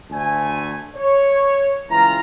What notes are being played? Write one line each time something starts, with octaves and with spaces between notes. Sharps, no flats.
D2 A3 G#5
C#5
C#2 E3 F4 A#5